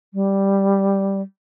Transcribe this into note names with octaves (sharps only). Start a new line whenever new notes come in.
G3